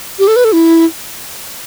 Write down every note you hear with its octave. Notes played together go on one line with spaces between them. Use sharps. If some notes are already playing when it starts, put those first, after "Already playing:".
G4
A4
B4
A4
E4